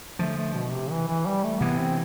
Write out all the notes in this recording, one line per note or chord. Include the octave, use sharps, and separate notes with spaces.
D3 F3 A3
A3
B2
C3
E3
E3
G3
A3
C3 E3 B3
C4